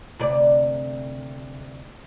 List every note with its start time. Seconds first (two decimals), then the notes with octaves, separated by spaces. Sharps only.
0.19 D2 C3 D5